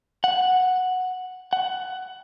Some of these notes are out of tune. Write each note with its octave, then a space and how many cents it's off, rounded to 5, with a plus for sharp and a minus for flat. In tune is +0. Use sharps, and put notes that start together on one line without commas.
F#5 -5
F#5 +15